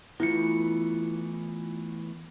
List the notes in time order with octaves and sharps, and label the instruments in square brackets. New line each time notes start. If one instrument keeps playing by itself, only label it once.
[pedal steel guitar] E3 A3 B3 [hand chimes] E4 F4 C#7